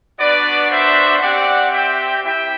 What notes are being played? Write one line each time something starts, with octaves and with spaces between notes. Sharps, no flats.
B3 D4 F#4 B4 D5
C5 E5
C4 G4 D5 F#5
E5 G5
C4 E4 G4 E5 G5